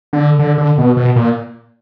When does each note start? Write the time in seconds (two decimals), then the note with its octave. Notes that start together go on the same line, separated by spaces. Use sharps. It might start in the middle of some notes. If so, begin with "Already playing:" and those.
0.13 D3
0.39 D3
0.58 D3
0.78 B2
0.97 B2
1.16 A#2